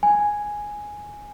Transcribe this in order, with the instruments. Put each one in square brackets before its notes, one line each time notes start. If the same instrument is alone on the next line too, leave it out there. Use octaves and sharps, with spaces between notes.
[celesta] G#5